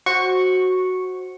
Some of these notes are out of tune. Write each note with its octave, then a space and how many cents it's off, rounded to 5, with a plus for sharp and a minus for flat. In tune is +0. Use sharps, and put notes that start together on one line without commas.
F#4 +0 C5 +20 C#6 -5